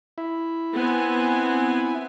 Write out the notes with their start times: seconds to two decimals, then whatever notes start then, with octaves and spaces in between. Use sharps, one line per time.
0.18 E4
0.73 B3 C4 G#5